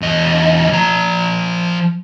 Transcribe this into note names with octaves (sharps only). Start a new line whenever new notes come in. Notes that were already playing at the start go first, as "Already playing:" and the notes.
E2 D#5
F3 A#5